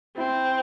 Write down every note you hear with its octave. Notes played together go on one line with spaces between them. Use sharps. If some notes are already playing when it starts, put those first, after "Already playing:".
C4 E4